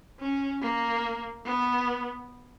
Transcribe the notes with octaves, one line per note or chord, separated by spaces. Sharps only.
C#4
A#3
B3